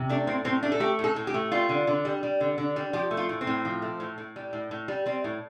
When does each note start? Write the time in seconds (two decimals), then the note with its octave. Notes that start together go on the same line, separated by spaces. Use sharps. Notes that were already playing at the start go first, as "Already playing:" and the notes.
Already playing: C3
0.09 A3 D4
0.27 A2 C4
0.45 A2 C4
0.63 A3 D4
0.72 A4
0.80 A3 G4
0.99 A2 A4
1.16 A2
1.27 G4
1.34 A3
1.52 G3 F4
1.69 D3
1.87 D3
2.05 G3
2.23 G3
2.41 D3
2.58 D3
2.76 G3
2.93 F3 G4
3.11 A3
3.17 F4
3.29 A2
3.41 C4
3.47 A2
3.65 F3
3.82 A3
4.00 A2
4.18 A2
4.36 G3
4.53 A2
4.71 A2
4.88 G3
5.06 G3 C4
5.24 A2